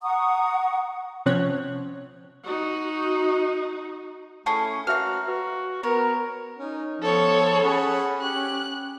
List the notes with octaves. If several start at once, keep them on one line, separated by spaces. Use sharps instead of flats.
F#5 A#5 C#6 D#6
C3 F3 C4 C#4 C#5 F#6
D#4 F#4
A3 C#4 E4 G#4 G5 A5
A#3 F#4 B4 C#5 E5 F6
F#4 B4
B3 A#4 C#5
C#4 D#4
F3 B3 A4 C#5
C#4 G#4 F#5 B5
G4 F#6